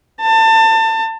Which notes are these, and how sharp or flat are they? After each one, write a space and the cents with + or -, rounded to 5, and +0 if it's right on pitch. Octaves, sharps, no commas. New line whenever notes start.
A5 +25